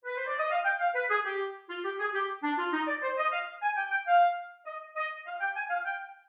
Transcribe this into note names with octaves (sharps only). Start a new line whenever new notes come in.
B4
C5
D5
D#5
F5
G5
F5
B4
G#4
G4
F4
G4
G#4
G4
D4
F4
D#4
D5
C5
D#5
F5
G#5
G5
G5
F5
D#5
D#5
F5
G5
G#5
F5
G5